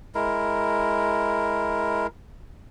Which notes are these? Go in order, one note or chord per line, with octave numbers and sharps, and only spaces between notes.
G#3 E4 A#4